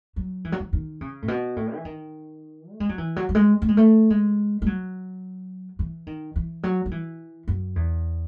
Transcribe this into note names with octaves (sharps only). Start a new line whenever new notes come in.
F#3
E3
F#3
E3
D#3
C#3
A2
B2
A2
E3
D#3
A3
G#3
F#3
E3
F#3
F#3
G#3
A3
G#3
A3
G#3
G#3
F#3
E3
D#3
E3
F#3
F#3
E3
F#2
E2